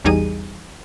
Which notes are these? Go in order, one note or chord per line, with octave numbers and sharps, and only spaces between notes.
A1 E2 G3 D#4 G#4 D#7